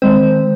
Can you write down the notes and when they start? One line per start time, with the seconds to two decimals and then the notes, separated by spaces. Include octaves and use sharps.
0.02 D#3 G#3 C4 C5